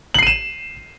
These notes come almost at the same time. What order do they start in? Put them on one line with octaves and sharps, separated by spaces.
F#7 C7 D#7 E7